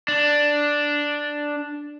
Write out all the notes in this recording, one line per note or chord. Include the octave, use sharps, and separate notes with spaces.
D4